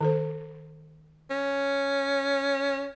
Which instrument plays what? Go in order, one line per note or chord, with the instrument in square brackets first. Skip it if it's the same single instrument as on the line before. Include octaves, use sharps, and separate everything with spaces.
[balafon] D#3 A4 C5
[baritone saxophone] C#4